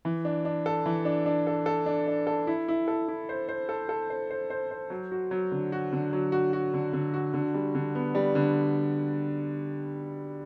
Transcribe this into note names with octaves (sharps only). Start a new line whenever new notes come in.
E3
D4
D4
A4
E3
D4
D4
A4
A4
D4
D4
A4
E4
E4
A4
E4
C5
C5
A4
A4
C5
C5
C5
C5
F#3
F#4
F#3
D3
F#4
D3
F#3
F#4
F#4
D3
D3
F#4
D3
G3
D3
B3
G3
D3